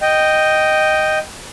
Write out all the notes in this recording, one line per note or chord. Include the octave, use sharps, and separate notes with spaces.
D#5 G5